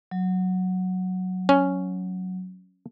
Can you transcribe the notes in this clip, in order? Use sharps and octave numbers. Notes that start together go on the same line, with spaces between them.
F#3
C#4